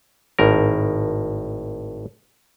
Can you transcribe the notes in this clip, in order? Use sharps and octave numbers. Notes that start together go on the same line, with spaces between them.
G#1 A2 A#4